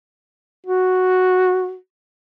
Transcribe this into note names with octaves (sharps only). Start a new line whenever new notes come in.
F#4